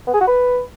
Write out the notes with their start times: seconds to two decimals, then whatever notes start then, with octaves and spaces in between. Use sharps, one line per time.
0.07 B3
0.14 G#4
0.21 F#4
0.28 B4